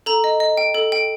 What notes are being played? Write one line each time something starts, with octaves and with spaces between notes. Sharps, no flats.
A4 A#5
D#5
D#5
G5
A4
G5